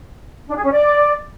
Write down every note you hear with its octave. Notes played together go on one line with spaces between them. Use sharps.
D4
G#4
C#4
D5